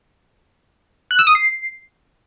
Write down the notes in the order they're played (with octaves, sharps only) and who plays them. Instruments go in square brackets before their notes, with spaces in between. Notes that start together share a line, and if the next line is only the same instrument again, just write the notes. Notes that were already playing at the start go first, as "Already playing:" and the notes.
[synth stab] F#6
E6
D#6
C7